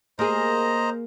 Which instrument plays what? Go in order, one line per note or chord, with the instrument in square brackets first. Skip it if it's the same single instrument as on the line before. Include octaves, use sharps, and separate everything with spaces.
[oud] A#3 G#4 [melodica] C5 D#5 A#5